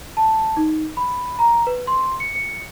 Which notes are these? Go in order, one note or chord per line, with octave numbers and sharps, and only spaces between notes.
A5
D#4
B5
A#5
B4
C6
C#7
C#7